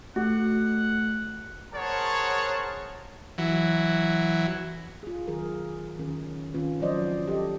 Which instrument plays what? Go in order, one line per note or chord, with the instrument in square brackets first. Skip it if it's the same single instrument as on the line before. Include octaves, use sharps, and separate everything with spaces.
[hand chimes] A3 [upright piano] F#4 [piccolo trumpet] F#5
[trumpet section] G#4 A#4 C5 C#5 F#5 A5
[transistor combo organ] E3 F#3
[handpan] F4 G#4
D#3 F#3 G#4 A#4
D3 D#3 C#4 A#4
D#3 C4 C#4 F4 B4
F3 F#3 F#4 C5 D5 D#5
G4 A4 D#5